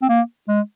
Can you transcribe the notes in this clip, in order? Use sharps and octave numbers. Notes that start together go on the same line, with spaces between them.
C4
A#3
G#3